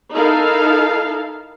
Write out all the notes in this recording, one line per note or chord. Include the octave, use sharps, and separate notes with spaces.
D#4 E4 A4 A#4 F5